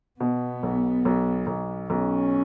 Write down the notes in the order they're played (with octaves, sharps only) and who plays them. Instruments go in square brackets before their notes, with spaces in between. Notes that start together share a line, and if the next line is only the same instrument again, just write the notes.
[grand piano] B2 [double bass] B3
[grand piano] B1
B1
B1
[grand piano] B1 [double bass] C#4